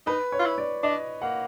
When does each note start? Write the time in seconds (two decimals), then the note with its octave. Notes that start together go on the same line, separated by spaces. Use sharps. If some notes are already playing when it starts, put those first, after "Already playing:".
0.06 D#4 B4
0.32 C#5
0.39 F4
0.45 E4
0.58 D5
0.83 D4 D#5
1.22 A#3 F#5